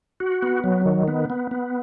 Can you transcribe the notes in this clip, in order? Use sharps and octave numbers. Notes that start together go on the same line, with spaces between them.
F#4
B3
F#3
D#3
B3
B3
B3